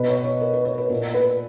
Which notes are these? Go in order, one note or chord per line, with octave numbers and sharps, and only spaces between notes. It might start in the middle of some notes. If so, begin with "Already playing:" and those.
Already playing: B2 B4
C#5
C#5
A#4
B4
C#5
B4
A#2 A#4
B4